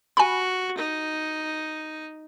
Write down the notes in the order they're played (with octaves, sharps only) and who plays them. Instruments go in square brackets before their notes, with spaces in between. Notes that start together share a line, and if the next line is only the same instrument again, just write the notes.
[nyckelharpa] F#4 [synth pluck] G#5 B5
[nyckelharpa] D#4